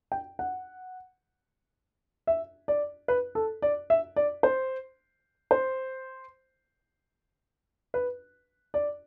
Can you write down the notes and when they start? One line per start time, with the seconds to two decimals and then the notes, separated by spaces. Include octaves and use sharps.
0.12 G5
0.39 F#5
2.27 E5
2.68 D5
3.08 B4
3.35 A4
3.62 D5
3.90 E5
4.16 D5
4.43 C5
5.51 C5
7.94 B4
8.74 D5